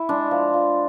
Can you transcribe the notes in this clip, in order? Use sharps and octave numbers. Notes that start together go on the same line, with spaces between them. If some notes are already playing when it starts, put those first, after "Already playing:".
Already playing: E4
G#3 D4
F3
F3